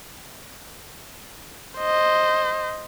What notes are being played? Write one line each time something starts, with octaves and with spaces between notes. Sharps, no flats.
C5 D#5